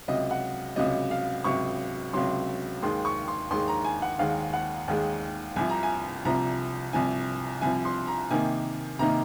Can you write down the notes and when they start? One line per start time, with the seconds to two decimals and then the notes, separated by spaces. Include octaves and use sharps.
0.08 C#2 C3 F#3 D#5
0.31 F#5
0.76 C#2 C3 F#3 D#5
1.11 F5
1.44 C#2 C3 F#3 C#6
2.13 C#2 C3 F#3 C6
2.82 D#2 D#3 G#3 C6
3.05 C#6
3.28 C6
3.50 D#2 D#3 G#3 C6
3.68 A#5
3.85 G#5
4.02 F#5
4.19 D#2 D#3 G#3 F5
4.53 F#5
4.88 D#2 D#3 G#3
5.56 C2 C3 F3 G#5
5.70 A#5
5.83 G#5
6.25 C2 C3 F3 A#5
6.93 C2 C3 F3 G#5
7.62 C2 C3 F3 G#5
7.85 C6
8.07 A#5
8.31 C3 D#3 A#3 D#4 G#5
8.99 C3 D#3 A#3 D#4 A#5